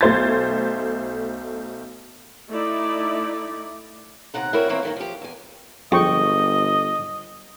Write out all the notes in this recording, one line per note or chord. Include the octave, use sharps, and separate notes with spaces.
B1 A3 C5 G#6 A6
A3 D#4 E4 D5
D#2 C3 F#5 A#5
C4 E4 F#4 A#4 C#5
F2 E3 A#3 C4 C#5 E5
G2 D#3 A#3
F3 G4
E2 G#5
G1 F2 G#4 D#5 G5 C#6